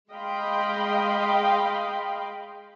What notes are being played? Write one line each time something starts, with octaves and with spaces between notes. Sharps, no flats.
G#3 D#5 F5 G5 B5 C6